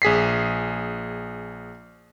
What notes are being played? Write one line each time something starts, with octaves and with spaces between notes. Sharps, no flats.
A#1 G#4 B6 C7